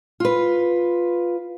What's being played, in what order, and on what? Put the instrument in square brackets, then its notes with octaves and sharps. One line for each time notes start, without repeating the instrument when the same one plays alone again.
[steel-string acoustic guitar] F4 B4